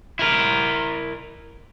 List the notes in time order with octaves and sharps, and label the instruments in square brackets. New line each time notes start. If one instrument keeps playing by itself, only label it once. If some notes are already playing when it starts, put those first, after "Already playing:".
[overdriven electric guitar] E4 A#4